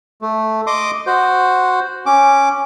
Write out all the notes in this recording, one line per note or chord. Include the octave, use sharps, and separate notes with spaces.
A3
D#5 C6 D6 D#6
F#4 C5
C#4 D6